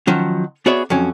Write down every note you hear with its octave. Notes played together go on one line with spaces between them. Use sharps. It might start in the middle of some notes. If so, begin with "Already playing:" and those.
D#3 F3 F#3 C#4
B3 F#4 G#4 C#5 D5 E5
F2 F#3 C#4